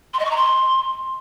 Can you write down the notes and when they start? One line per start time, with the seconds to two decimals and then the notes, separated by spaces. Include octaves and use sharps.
0.14 C6
0.19 D#5
0.25 C#6
0.31 A#5
0.37 C6